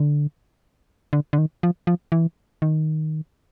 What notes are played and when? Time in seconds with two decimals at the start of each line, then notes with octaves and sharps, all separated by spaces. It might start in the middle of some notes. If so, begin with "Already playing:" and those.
Already playing: D3
1.13 D3
1.33 D3
1.38 D#3
1.63 F3
1.87 F3
2.12 E3
2.62 D#3